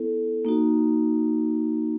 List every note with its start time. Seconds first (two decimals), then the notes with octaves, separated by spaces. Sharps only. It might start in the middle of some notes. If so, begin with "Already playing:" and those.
Already playing: B3 E4 A4
0.45 A#3 D#4 F#4